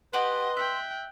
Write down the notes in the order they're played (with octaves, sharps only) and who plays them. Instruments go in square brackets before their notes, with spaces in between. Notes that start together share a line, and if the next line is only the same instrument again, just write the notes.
[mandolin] G4 F#5 G#5 [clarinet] B4 [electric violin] D#5 [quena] C6
[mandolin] E5 [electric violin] G5 F#6